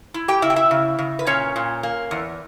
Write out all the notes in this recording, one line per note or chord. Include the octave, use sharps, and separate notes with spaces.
E4
G4 G5
C#3 E4 E5
G5
E4 E5
C#3
C#3
B4
A#2 C#4 C#5
A#2
A#3
E2